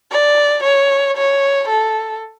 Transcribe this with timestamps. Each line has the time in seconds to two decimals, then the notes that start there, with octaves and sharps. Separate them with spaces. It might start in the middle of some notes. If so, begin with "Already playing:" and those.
0.11 D5
0.64 C#5
1.17 C#5
1.69 A4